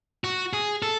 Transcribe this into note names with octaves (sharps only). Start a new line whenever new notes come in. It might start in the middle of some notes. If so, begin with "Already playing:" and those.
F#4
G#4
A4